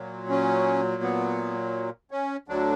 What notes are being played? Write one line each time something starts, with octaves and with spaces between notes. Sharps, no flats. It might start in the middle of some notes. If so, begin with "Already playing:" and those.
Already playing: A#2 F#3
C#4
B3
C#4
D2 D3 F#3 D4